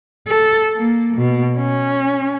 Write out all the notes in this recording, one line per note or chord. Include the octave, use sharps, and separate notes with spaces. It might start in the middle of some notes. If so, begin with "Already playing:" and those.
A4
A#3
B2
C#4